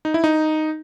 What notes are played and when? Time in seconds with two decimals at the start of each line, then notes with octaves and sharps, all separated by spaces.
0.05 D#4
0.14 E4
0.24 D#4